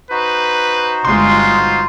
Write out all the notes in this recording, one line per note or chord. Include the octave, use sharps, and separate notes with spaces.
D#4 F#4 B4 C5
G1 G#3 F4 C6